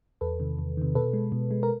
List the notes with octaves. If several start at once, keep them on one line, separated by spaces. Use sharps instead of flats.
E2 A4 B4
C3 D#3
E2
C3 D#3
B2 A4 B4
G#3
B2
G#3
A#4